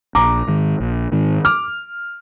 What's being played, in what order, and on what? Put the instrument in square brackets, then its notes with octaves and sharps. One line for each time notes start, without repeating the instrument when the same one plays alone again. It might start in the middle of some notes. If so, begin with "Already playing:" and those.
[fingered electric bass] A#1 [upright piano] A#5 D6
[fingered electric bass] G#2 D#3
A#1
G#2 D#3
[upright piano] D6 F6